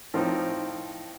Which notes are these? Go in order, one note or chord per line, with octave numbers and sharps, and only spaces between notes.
A2 F3 C4 D#4